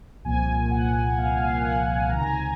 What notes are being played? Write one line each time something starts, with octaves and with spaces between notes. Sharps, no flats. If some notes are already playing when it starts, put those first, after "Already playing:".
C2 A#2 F3 A#3 G#5
F#5
C2 A#2 F3 A#3 F5
F5
F#5
G#5
C#2 C3 D#3 A#5
G#5
A#5